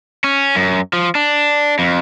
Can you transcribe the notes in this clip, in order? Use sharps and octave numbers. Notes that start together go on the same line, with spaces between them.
C#4
F#2
F3
D4
F2